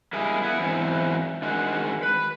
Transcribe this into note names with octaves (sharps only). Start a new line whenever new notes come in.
G3 G#3 A#3 E4 G#4
B3 E4
E2 G#2 E3 F#3 C4
D3 D#3 G#3 F#4
B4